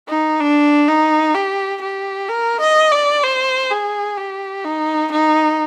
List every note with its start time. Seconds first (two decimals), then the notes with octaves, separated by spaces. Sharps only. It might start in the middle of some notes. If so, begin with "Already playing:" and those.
0.09 D#4
0.40 D4
0.88 D#4
1.35 G4
1.82 G4
2.29 A#4
2.61 D#5
2.92 D5
3.23 C5
3.71 G#4
4.17 G4
4.65 D#4
5.12 D#4